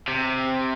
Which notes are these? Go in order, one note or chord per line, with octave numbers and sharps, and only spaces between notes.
C3